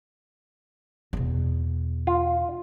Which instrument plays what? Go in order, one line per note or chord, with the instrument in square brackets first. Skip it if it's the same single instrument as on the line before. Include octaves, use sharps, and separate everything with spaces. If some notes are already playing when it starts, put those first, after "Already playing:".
[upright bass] E2 B2
[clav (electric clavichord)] F4